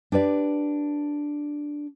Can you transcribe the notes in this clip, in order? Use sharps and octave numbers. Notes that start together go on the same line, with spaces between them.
D4 G4 B4 D5